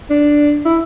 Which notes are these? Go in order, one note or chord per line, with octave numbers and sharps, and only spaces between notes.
D4
E4